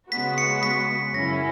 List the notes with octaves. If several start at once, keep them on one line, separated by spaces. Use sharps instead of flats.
C#3 G#3 B3 F#4 B6
C#7
B6
F#2 C#3 F#3 C#4 E4 A#6